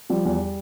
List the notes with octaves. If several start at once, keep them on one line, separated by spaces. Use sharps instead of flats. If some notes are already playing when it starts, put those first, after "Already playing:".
F3 G3
E2